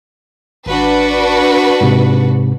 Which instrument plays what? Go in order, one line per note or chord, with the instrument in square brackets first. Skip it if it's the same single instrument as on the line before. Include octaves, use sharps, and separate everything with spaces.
[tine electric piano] G#1 [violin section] D4 F#4 B4
[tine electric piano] G#2 C3